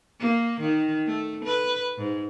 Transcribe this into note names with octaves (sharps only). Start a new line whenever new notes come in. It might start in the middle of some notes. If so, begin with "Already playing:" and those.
A#3
D#3
A3
B4
G#2